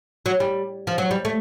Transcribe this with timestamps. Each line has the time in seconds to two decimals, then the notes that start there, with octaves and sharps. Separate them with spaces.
0.26 F#3
0.40 G3
0.87 F3
0.98 F#3
1.11 G3
1.25 A3